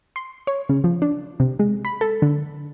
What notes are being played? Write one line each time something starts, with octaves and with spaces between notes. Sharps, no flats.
C6
C#5
C#3
F3
D4
C3
G#3
B5
A4
D3